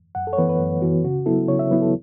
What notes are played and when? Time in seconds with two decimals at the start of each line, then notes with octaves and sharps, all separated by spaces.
0.15 F#2 F#5
0.27 A4
0.33 C#5
0.38 E3 B3 B4
0.49 B4
0.59 F#2
0.82 E3 B3 F#4
1.04 C#3 F#4
1.26 F#3 B3 E4 A4
1.48 C#3 C#5
1.59 E5
1.70 F#3 B3 E4 B4
1.82 A4